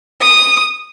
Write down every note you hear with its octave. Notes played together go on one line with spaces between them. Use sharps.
D#6